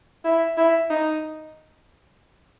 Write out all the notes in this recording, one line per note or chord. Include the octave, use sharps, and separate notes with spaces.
E4
E4
D#4